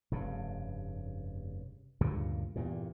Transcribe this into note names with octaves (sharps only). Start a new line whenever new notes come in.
F1 G2 C#3
D2 G2 A#2 C#3
E2 G2 A#2